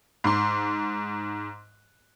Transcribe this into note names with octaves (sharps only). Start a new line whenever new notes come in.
G#2 C6